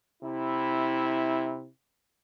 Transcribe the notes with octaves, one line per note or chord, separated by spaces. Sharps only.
C3 E4